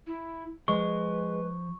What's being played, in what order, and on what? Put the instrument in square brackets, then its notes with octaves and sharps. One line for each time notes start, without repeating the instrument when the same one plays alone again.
[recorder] E4
[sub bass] F3 [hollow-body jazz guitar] G#3 [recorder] B4 [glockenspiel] C#6